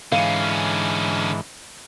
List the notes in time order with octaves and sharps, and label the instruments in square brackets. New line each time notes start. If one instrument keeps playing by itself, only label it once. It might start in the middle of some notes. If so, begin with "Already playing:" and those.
[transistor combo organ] G#2 E3 [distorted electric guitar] D3 C#4 [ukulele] F5